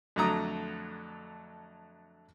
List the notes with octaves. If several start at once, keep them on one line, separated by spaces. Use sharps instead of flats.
F2 D3 F#3 A3 A#5 D#6